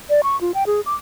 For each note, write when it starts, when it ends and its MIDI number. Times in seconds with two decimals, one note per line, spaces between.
0.10 0.21 74
0.23 0.39 85
0.41 0.52 65
0.54 0.64 79
0.67 0.81 68
0.86 0.95 86